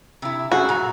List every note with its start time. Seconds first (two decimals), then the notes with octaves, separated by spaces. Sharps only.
0.22 C3 E4
0.52 F#2 F#4 G#4
0.69 A#2 A#5